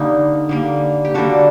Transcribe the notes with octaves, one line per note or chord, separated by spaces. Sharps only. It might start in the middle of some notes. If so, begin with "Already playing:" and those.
Already playing: D3 G3 A#3 D#4
D3 G3 A#3
G4
D3 G3 A#3 F#4 A4